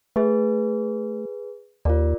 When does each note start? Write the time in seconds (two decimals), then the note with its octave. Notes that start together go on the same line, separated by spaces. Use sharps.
0.16 A3 G#4 B4
1.85 D#2 F4 A#4 D5